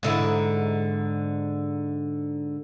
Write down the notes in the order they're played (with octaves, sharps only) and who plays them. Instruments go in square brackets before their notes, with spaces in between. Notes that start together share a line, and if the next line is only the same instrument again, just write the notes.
[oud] G#2 D3 E4